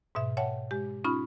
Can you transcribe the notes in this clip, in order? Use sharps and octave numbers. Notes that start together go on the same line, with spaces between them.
G#2 B2 E5
C#5 E5 F#5 G5 A5
G#3 G4
C#4 D#4 F4 B5